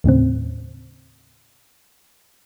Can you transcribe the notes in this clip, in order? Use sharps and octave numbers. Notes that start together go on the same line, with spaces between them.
D#2 A2 C#3 C4